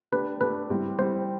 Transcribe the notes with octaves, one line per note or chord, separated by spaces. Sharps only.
A3 D4 G4 B4
A3 D4 G4 B4
G3 C4 E4 G4
G3 C4 E4 G4 C5